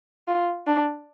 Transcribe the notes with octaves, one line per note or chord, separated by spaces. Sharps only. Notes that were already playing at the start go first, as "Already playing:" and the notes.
F4
D4